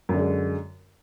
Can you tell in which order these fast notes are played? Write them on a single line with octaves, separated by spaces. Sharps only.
F#2 D3 G#3